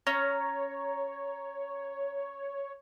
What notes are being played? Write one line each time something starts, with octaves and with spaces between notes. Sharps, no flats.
C#4 C#5 A#5